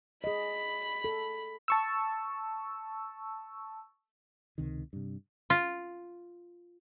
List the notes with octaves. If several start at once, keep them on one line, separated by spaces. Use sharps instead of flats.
G#4 D#5 B5
A4
A5 C#6 E6
C#2 C3 D#3
G2 C3
F4